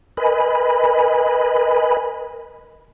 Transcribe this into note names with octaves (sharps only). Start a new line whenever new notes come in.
A#4 B4 D#5 G#5 B5